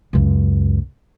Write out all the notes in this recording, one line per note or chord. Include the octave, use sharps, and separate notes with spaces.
C#2 F#2